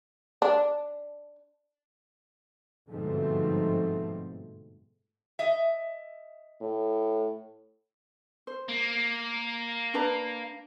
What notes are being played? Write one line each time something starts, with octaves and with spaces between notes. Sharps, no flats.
D4
G1 G#2 B2 F3 A3 C4
D#5 E5
A2
C5
A#3
D4 B4 A#5